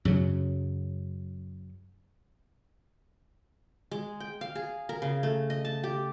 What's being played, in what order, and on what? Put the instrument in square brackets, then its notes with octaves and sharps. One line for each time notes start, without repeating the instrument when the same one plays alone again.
[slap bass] F#2 C#3 F#3
[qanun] G#3
G5
F5
G#4
A#4
C#3
A3
D#5
A5
G4